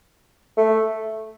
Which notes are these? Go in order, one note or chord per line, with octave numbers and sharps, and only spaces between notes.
A3